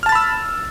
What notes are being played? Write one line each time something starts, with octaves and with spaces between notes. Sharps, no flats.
A5 B5 E6 F6 A6